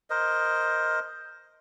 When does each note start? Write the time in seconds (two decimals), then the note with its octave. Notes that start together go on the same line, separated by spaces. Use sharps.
0.10 A#4 C5 D#5